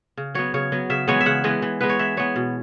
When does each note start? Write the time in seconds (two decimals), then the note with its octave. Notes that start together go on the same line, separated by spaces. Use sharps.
0.17 C#3
0.35 F#3 B3 C#5
0.54 C#3 C#5
0.72 F#3 B3
0.90 C#3 E5
1.08 E3 G#3 B3 C#5
1.21 E5
1.26 C#3 F#5
1.44 E3 G#3 B3
1.62 E3
1.80 G#3 B3 B4
1.89 C#5
1.99 E3 E5
2.17 G#3 B3 C#5
2.36 B2